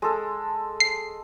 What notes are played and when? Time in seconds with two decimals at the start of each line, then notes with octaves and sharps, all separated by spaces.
0.02 G#3 A4
0.80 C7